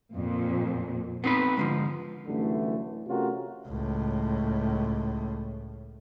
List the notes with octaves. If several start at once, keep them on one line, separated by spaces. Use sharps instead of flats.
F2 A#2
B3 C4 D#4 B4
G#2 D3 F3
C2 F#2 D3 E3 A3
C3 A3 C#4 F4 F#4 A#4
C#2 A2